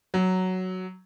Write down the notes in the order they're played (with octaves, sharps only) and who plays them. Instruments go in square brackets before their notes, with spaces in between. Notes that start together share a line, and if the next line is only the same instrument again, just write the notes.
[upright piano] F#3